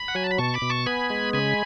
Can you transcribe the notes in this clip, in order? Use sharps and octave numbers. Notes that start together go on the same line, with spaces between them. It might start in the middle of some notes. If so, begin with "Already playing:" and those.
Already playing: B5
F#5
F#3 G#5
A5
B5
B2 A5 C#6
B5 D6
B2
A5 C#6
B3 G#5 B5
G#3
C#3 G#5 B5